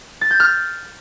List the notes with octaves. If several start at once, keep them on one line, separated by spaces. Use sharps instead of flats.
A6
G6
F6